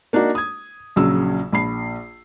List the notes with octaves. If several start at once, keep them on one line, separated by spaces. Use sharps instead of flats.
A#3 D4 D#4 F#4
D#6 G#6
A#1 C#3 F#3 E6
A#1 B5 C7